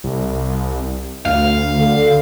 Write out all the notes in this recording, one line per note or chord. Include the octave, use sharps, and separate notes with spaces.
C2
D2 F5
D3